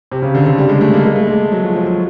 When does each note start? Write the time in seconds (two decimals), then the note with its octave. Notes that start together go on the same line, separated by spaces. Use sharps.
0.11 C3
0.22 C#3
0.35 D3
0.46 D3
0.58 G3
0.69 G#3
0.81 A3
0.94 A#3
1.05 G#3
1.16 A3
1.27 G#3
1.52 F#3
1.64 F3
1.75 F3
1.87 F#3